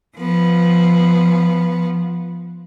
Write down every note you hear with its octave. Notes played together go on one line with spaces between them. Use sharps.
F3 B3